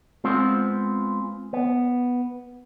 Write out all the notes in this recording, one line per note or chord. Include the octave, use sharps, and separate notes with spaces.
G#3 B3 C4 F4
B3